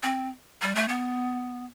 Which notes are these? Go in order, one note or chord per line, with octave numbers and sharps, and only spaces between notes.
C4
G3
A3
B3